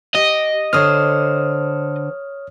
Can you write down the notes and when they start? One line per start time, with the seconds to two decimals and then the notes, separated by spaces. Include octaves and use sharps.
0.15 G4 D#5
0.73 D3 C5 C#5 D#6 F6